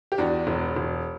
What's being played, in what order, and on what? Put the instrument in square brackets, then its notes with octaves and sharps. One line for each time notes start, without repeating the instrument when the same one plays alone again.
[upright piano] G4
E2 D4 F#4
E1
E1